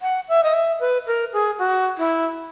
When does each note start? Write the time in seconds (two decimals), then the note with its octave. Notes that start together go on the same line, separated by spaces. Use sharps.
0.02 F#5
0.29 E5
0.43 D#5
0.54 E5
0.80 B4
1.07 A#4
1.33 G#4
1.59 F#4
1.98 E4